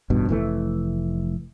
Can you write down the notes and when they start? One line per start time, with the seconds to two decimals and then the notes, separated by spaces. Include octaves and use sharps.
0.10 A1 G2 B2
0.29 F1 E3 A3